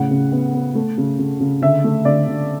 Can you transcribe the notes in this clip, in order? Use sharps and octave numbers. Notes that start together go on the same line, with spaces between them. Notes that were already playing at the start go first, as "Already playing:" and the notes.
Already playing: A2 C#3 F#5
C#3
B3
B3
A3
C#3
C#3
C#3
D3 E5
A3
D3 D5
D3